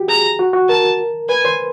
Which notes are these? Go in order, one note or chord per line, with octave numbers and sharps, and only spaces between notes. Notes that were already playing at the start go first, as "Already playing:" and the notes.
Already playing: F#4 G4
G#4 A#5
F#4
F#4
A#4 A5
B4 G#5
C5